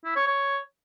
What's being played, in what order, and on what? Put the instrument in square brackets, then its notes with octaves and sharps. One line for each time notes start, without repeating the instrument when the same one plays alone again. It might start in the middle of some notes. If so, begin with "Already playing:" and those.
[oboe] E4
C#5
C#5